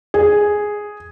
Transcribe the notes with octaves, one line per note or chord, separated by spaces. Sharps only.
G#4